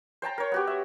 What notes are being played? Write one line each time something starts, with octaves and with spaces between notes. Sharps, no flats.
C5 G5 A5 A#5
A#4 C#5
B3 F#4 G4
E5